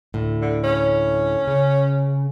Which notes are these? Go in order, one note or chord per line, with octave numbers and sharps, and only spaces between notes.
D2 A2
D3
C#4
C#3